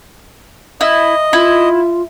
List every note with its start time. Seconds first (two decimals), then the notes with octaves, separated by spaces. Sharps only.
0.81 E4 D#5
1.33 E4 F4